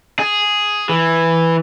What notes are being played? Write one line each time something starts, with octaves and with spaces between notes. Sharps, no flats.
G#4
E3